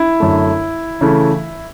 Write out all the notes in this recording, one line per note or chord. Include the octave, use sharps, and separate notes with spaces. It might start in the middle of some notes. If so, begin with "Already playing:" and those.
Already playing: E4
F#2 D3 A3
C#3 E3 A3